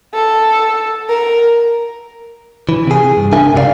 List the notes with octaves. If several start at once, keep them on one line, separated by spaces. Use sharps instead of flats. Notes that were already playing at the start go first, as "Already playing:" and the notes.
A4
A#4
E3
C3 G#4
G2
C#2 D4 D#4 A#4 E5 G#5
C2 C#3 G4 D5 F5